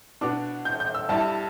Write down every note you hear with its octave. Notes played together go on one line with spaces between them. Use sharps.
B2 B3 D4 D6
G6
G6
E6
G2 G3 E4 A5